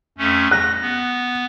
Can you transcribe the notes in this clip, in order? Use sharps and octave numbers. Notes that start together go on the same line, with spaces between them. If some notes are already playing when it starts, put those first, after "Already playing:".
F2 A3 C#4
F#6 A#6
B3